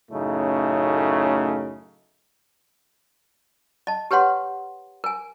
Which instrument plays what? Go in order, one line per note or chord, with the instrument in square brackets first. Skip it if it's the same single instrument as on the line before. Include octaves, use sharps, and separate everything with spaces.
[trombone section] F#2 A2 C#3 A3 D#4
[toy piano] D#5 A5
G4 B4 C#5 F#5 C6
A#4 G#5